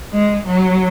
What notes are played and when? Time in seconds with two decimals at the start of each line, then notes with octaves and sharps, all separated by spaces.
0.12 G#3
0.46 F#3